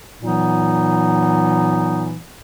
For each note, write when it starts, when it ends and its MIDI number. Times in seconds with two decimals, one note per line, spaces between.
0.22 2.17 46
0.22 2.17 52
0.22 2.17 54
0.22 2.17 59
0.22 2.17 63